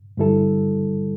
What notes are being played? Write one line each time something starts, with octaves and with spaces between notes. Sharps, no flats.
G2 D3 G3 E4 A4